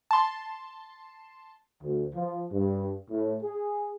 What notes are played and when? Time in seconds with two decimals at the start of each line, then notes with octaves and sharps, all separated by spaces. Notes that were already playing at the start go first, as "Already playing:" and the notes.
0.11 A5 C6
1.82 D2
2.13 F3
2.52 G2
3.09 A2
3.42 G#4